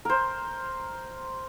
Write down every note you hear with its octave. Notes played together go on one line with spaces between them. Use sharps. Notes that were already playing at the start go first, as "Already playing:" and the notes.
A#4 C5